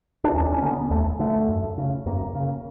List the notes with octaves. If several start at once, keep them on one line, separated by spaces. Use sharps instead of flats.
D4
D#2 C#4
C#4
D3 A#3
B3
D#2 A3
D3 A3
F#2
C#3
F#2 A#3
C#3